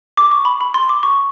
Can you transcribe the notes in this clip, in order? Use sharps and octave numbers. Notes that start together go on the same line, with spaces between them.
D6
C#6
B5
B5
C6
D6
C#6